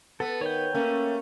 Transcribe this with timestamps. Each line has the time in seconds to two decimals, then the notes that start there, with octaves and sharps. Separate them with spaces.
0.20 B3 A4
0.41 D#3 C#5 G5
0.75 A3 A#3 C#4